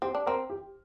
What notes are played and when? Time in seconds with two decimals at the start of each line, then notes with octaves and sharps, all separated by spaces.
0.02 C4 G4
0.15 D4
0.26 C4 A#4
0.50 G4